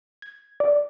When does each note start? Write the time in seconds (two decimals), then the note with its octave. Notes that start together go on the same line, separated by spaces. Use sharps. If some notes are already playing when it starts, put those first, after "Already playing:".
0.22 G#6
0.60 D5